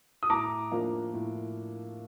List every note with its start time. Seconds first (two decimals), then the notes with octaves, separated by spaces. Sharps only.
0.23 D#6
0.30 A2 A#5 D6
0.71 F3 A#3 D4
1.13 A2